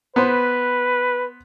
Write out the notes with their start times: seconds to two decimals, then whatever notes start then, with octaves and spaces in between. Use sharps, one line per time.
0.16 B3 B4 C5